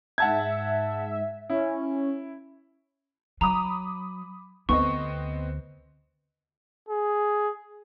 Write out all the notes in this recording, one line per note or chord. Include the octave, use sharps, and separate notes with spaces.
G#2 E5 F#5 A5 G#6
C#4 E4
F#3 A#5 B5 D6 D#6
D2 B3 C4 D#5 C#6
G#4